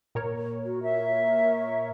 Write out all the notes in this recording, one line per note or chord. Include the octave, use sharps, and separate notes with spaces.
A#2 A#4 C#5
F#4
E5